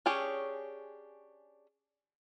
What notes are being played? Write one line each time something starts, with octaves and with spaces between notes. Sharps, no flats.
C#4 D4 G4 G#4 C#5